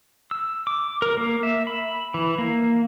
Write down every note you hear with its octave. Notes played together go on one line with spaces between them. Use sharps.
E6
D6
A#4
A#3
E5
B5
E3
A#3